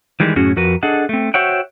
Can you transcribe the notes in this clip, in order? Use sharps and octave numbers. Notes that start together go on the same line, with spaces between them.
D#3 E3 G3 G#3
F#2 A2 C#4 F#4 G#4
F2 F#4 A#4 B4
D4 G#4 A4 D#5 F#5
A3 C4
F#4 C5 C#5 E5 F#5 G5